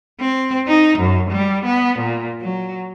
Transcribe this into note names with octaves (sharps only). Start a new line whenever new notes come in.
C4
D#4
F#2
G3
B3
A#2
F#3